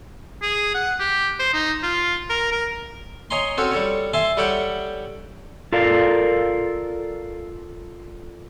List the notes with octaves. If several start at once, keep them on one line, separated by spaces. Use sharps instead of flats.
G#4
F#5
G4
C5
D#4
F4
A#4
A#4
C#5 D#5 G#5 A#5 C6
C4 C#4 F#4 A4 C#5
G3 A4 C#5
E5 G#5 A5 C6
G3 G4 A4 C#5 F#5 G5
F4 A4 A#4 D5 F5